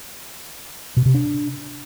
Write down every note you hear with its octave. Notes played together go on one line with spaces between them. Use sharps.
B2
C3
D4